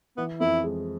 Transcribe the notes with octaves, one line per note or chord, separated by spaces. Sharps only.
E3 B3
F2 E4
G#3